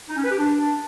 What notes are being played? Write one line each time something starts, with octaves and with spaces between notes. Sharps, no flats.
D#4
C#4
B4
G4
D4